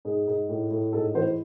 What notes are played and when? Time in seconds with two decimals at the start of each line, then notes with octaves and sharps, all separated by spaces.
0.05 G#2 G#4
0.27 G#2
0.49 A2
0.71 A2
0.93 G#2 A4
1.15 E3 C5